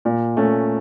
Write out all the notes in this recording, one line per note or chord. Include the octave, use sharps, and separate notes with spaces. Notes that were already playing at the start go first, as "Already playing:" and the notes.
A#2
A3 C#4